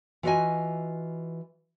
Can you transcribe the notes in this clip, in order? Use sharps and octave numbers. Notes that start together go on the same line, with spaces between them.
E3 F4 F#4 C5 D#5 G#5